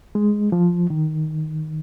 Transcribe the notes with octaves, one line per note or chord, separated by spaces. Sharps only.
G#3
F3
D#3